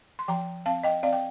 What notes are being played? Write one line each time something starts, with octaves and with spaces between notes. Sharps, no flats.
C6
F3 G5 A#5
C4 F5 A5
D#5 G5
C4 D5 F5
G5